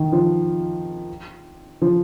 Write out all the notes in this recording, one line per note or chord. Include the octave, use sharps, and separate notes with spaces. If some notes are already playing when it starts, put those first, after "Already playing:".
Already playing: D#3
F3
F3